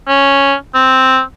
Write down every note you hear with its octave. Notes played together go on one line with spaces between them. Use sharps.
C#4
C4